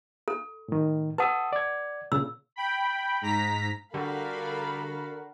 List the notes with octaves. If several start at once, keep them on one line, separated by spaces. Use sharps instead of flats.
A4
A2 D#3
B4 F#5 A5 D#6 E6
D5 G#6
A#2 C#3 E6
G5 B5
G#2 A#5 B6
D3 G3 F#4 A4 A#4 F5 B5